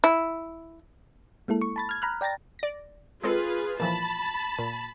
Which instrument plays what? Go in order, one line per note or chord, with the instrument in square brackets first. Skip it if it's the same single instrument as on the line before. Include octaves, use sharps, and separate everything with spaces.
[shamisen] E4
[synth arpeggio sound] G#3 A#3 E4 A4
C#6
A5 B5 A6
F6 G#6
A#5 B5 F6 F#6
D5 G5 A#5 A6 A#6
D5 A#6
[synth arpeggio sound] G#3 C4 A4 [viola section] F4 G#4 B4
[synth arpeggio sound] A#2 E3 F3 [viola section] A5 B5
[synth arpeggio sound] A#2